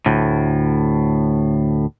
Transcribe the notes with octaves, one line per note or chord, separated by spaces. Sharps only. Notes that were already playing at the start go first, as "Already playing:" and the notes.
D2 A2